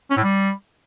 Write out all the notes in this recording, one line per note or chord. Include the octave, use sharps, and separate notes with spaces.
C#4
A2
G3